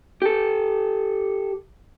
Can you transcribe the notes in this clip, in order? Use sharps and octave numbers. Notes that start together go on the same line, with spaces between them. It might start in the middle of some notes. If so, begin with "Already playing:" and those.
G4 A4